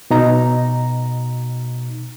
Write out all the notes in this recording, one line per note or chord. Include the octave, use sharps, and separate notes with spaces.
B2 D#4 A#5